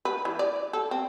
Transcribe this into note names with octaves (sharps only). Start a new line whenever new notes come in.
B4
E3
D5
A4
C4